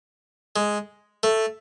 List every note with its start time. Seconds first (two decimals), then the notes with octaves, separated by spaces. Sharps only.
0.56 G#3
1.23 A3